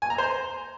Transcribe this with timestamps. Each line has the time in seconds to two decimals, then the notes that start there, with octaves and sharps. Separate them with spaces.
0.02 G#5
0.10 A#5
0.18 C5